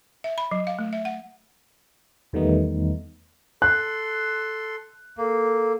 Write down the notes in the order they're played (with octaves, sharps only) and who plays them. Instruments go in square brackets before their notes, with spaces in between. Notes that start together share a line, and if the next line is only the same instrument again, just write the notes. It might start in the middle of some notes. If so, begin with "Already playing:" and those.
[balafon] E5
B5
F#3
F5
A3
E5
F#5
[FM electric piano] E2 D#3 G3 A3 B3 D#4
[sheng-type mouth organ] A4 C6 [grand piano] F#6
[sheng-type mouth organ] A#3 [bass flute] A4